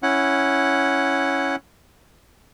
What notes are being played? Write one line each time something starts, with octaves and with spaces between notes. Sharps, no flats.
C#4 E4 F#5